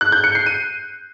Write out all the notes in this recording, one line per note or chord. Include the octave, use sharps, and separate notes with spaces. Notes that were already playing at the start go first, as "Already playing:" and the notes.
F#6
G6
C#7
C7
D#7